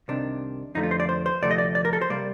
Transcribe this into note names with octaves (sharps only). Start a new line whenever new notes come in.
C2 C3 D#3 D4
F2 D3 F3 A3 D#4
F4
C5
D5
C5
C5
D2 C3 F3 A3 D5
D#5
D5
D5
A#4
A4
C5
C3 G3 A#3 D5